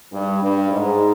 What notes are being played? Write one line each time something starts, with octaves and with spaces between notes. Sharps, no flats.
G2
G2
G#2